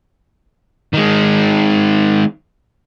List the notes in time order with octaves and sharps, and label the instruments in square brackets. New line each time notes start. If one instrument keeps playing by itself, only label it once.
[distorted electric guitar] D#3 G#3